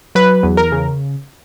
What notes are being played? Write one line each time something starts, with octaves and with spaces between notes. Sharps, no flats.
F#3 B4
E2
A#4
C#3